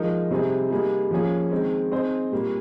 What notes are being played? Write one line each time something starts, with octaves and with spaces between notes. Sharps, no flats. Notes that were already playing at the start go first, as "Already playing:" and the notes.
Already playing: F3 G#3 D#4 A#4
C3 G3 C4 D#4 G#4
G3 A#3 D#4 G#4
F3 A#3 C#4 G#4
D#3 G#3 C4
C4 D#4 G#4 C5
A#2 G3 A#3